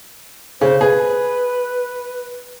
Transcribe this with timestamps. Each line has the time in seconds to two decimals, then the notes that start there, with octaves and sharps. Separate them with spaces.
0.61 C#3 C5
0.81 G#4 B4